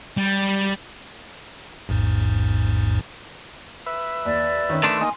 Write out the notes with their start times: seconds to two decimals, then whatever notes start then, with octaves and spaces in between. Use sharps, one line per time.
0.17 G3
1.89 A1 E2 G#2
3.86 B4 E5
4.25 D#2 D5
4.69 D#3 C#4 D#4
4.83 D#3 A3 D4 C6
5.01 A#3 D#4 D#5 G#5